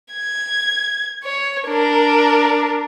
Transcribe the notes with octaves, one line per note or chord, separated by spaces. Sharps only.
G#6
C#5
D4 A#4